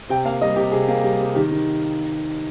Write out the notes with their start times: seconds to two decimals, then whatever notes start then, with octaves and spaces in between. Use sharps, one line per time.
0.09 C3 G5
0.25 A#3 F5
0.41 G3 D#5
0.56 C3 G4
0.72 C3 G#4
0.88 A#3
1.04 G3
1.20 C3
1.34 D#3 G4
1.51 D#3